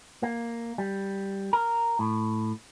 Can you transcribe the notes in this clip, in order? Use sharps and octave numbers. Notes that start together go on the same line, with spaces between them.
A#3
G3
A#4
A2